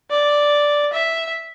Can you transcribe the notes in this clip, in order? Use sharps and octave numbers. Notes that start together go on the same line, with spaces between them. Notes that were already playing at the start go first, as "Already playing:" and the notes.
D5
E5